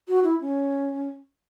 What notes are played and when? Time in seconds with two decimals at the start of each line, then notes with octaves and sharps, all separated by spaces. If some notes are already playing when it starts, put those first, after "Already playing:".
0.08 F#4
0.24 E4
0.41 C#4